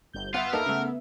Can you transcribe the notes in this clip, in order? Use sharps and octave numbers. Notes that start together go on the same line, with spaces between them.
G1 G6
B3 F4 E5 F#5
A#3 D#4 A4 A#4
C#3 A3